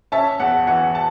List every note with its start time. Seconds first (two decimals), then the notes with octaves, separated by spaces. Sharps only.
0.12 C#4 E5 A5
0.40 E2 F#5
0.67 E3 F#5
0.95 A5